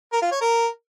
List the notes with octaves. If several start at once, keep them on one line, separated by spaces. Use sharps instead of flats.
A#4
F4
C#5
A#4